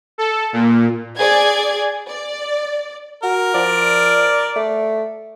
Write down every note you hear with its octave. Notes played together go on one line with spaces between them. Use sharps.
A4
A#2
G#4 D5 G#6
D5
F#4 A#4
F3 D5
A3